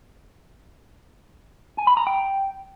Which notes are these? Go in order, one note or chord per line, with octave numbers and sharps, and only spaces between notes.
G#5
B5
A#5
G5